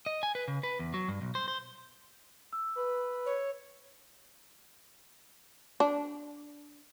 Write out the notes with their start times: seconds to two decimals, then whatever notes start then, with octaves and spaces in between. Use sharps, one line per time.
0.06 D#5
0.23 G#5
0.35 B4
0.48 C#3
0.63 B4
0.79 E2
0.94 F#3
1.08 G2
1.22 B1
1.35 C5
1.48 C5
2.53 E6
2.76 B4
3.26 C#5
5.80 D4